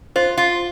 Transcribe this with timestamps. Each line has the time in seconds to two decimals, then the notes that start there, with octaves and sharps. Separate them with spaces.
0.16 F4 C5
0.38 F4